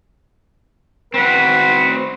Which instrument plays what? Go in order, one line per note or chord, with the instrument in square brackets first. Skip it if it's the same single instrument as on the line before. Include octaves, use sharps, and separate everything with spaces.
[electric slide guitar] C4 F#4 [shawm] B4